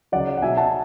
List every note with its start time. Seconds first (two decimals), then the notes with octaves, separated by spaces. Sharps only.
0.12 C#3 F#3 D5 F#5
0.37 F#5
0.42 B2 F#3 E5 G#5
0.57 F#5 A5